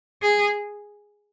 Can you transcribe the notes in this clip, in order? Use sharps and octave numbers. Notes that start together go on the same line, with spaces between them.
G#4